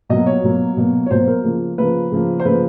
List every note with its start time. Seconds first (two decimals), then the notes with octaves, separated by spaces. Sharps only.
0.09 B2 F#3 A#3 D#5
0.26 C#5
0.43 B2 F#3 A#3
0.77 B2 F#3 A#3
1.06 C#5
1.11 B2 F#3 A#3 C5
1.28 A#4
1.44 C#3 F3 A#3
1.78 C#3 F3 A#3 B4
2.12 C#3 F3 A#3
2.40 C5
2.45 C#3 F3 A#3 B4